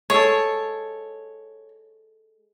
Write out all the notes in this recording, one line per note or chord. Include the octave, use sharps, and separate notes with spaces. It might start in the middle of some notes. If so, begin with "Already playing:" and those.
G#3 A4 C#5